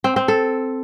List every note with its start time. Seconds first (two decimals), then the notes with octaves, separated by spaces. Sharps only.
0.04 C4
0.16 C4
0.28 A4